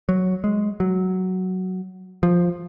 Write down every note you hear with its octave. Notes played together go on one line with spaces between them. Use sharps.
F#3
G#3
F#3
F3